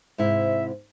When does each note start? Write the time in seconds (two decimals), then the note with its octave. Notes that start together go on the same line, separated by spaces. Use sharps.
0.18 G#2 C3 E4 E5